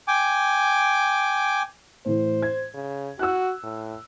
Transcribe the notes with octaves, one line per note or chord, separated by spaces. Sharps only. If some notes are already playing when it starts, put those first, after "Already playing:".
G5 G#5 D6
A2 E3 C5
G#6
C#3
F#4 E6 F#6
A2